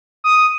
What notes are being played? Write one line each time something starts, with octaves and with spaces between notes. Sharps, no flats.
D#6